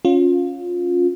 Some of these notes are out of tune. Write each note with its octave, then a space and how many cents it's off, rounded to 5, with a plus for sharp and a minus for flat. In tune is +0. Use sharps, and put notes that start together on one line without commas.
C#4 +0 F4 +20